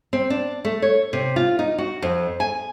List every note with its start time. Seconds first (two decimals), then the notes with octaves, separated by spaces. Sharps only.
0.13 C4
0.30 D4
0.65 A3
0.82 C#5
1.13 C3
1.36 F4
1.59 D#4
1.78 F#4
2.02 F2
2.40 G#5